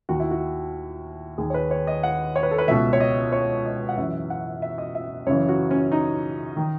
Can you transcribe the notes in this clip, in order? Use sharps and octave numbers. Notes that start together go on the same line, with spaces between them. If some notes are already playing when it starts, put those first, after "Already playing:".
D#2 D#3 F#4
E4
F#4
D#2 D#3 G#4
C#5
B4
C#5
D#5
F#5
C#5
B4
A4
B4
C#2 B2 E5
C#5
D#5
C#5
D#5
F#5
F#2 E3 E5
F#5
E5
D#5
E5
F#2 C#3 E3 C#5
F#4
C#4
D#4
D#3